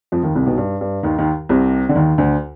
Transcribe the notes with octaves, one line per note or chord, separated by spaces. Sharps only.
F2 F3
D#2 D#3
C2 C3
B1 B2
G2
G2
D#2 D#3
D#2 D#3
C2 C3
D3
D#2 D#3
D2 D3